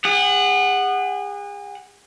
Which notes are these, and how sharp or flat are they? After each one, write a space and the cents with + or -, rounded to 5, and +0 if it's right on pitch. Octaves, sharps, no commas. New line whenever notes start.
G#4 -40 F#5 +0